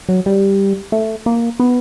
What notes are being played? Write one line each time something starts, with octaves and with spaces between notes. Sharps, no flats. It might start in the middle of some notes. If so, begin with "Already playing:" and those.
F#3
G3
A3
A#3
B3